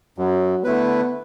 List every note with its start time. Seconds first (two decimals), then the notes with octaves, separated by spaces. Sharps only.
0.18 F#2 F#3
0.64 D3 A3 B3 E4 B4